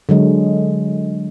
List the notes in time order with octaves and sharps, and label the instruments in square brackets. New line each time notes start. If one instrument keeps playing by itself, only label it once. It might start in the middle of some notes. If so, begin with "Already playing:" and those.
[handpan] D3 F#3 G#3